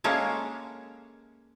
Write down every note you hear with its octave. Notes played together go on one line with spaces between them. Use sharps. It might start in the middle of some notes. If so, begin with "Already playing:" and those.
G#3 A#3 C#4 A4